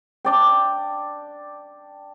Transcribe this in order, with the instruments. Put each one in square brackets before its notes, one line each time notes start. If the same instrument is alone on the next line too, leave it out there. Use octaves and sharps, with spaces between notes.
[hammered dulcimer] D4 D5 G5